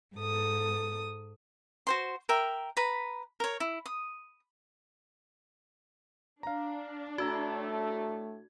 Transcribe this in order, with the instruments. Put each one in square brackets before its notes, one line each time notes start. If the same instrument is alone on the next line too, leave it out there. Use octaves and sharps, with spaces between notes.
[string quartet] G#2 A4 D#6
[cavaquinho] F#4 C5 C6
A#4 E5 G5
B4 A#5 B5
A#4 C#5
E4
D#6
[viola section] D4 [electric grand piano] F5 A#5
[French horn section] A2 A3 [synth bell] F#4 [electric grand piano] A#5 E6 G#6